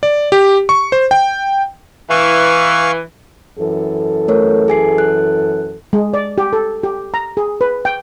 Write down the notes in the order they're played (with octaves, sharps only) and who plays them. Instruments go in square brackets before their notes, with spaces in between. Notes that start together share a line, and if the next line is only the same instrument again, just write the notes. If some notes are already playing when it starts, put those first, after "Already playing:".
[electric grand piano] D5
G4
C#6
C5
G5
[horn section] E3 [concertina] F5 C#6
[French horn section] F#2 E3 A4
[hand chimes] A3 A#4 C#5
G#4 G#5 C7
F#6
[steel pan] G#3
D5
G4
A4
G4
A#5
G#4
B4
G5